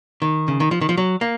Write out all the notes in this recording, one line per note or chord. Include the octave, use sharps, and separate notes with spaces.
D#3
C#3
D#3
F3
D#3
F3
F#3
A#3